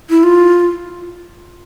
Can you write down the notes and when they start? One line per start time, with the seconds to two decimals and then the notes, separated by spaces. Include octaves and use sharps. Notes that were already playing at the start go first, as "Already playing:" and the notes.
0.10 E4
0.23 F4